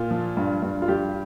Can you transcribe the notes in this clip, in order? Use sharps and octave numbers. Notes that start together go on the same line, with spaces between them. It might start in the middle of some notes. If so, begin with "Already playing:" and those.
Already playing: A#2 F4
F3
G2
G2
F4
G2 G4